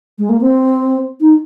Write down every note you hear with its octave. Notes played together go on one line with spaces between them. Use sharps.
G#3
A#3
C4
D#4